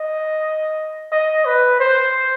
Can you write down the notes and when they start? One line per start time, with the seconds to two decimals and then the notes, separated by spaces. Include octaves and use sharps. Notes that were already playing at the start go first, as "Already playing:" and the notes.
Already playing: D#5
1.12 D#5
1.45 B4
1.80 C5